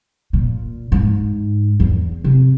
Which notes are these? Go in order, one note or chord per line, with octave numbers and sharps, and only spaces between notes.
A#2
G#2
E2
C3